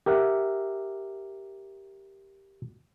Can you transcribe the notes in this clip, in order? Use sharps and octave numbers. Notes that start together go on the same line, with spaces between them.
G4 A#4 E5 F#5